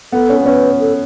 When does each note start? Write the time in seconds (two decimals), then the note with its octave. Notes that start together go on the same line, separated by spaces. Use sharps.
0.12 B3 A4
0.29 C#4
0.41 B3
0.46 C#4 B4
0.81 A4